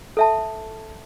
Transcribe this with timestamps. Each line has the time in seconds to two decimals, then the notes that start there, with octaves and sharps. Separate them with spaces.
0.17 A4 E5 A5